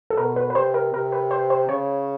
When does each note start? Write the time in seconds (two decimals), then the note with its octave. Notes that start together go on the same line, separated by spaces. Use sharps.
0.10 A4
0.17 B2 A#4
0.36 B4
0.50 B4
0.55 C3 C5
0.74 A#4
0.93 C3 A#4
1.12 B4
1.31 C5
1.50 C5
1.69 C#3 C#5